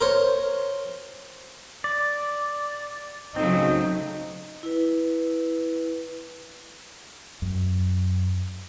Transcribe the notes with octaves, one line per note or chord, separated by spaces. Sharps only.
A#4 C5 C#5
D5
C#3 F#3 A3 C4 D#4
E4 B4
F#2